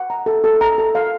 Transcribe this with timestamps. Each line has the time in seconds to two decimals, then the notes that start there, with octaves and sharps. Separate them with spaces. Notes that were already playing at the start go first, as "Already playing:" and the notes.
Already playing: F#5
0.10 A#5
0.26 A4
0.44 A4
0.61 A#5
0.78 A4
0.95 F5